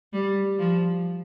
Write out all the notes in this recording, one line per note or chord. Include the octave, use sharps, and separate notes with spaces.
G3
F3